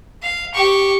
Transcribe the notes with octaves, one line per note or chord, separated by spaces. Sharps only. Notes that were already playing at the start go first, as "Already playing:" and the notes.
F5
G4 C#6